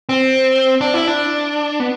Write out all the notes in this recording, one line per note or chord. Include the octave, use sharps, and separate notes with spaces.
C4
D4
E4
D4
B3